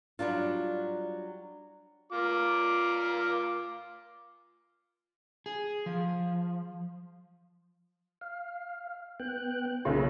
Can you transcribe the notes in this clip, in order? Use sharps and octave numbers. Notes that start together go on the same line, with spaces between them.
F#3 G3 D4 F4
F4 D6
G#4
F3
F5
B3 G5 F#6
B1 C#3 A#3 F4 C#5